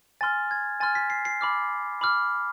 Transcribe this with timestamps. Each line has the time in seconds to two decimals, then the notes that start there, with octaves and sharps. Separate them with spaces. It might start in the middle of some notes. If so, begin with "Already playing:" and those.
0.21 G#5 C6 F6 A6
0.51 G#6
0.80 G#5 C6 F6 A6
0.95 B6
1.10 C7
1.25 C7
1.41 B5 D6 F6
2.01 B5 D6 F6